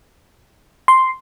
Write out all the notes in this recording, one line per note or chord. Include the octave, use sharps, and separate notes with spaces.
C6